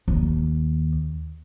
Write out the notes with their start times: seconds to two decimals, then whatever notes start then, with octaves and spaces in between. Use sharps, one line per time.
0.08 D#2